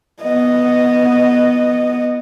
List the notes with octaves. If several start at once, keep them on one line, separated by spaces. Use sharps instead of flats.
B3 D#5